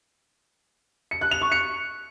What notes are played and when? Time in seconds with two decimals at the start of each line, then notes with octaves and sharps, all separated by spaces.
1.11 C#7
1.21 F#6
1.31 F7
1.42 C#6
1.52 C#7